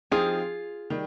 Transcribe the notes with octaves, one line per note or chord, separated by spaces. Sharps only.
F3 C4 D#4 F4 G4 G#4
D#3 G3